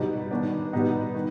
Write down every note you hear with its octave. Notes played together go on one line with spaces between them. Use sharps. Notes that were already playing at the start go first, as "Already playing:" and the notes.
Already playing: B2 G3 B3 D#4
D#3 B3 D4
B2 G3 B3 D#4
D#3